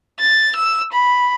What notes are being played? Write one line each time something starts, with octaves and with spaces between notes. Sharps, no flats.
A6
E6
B5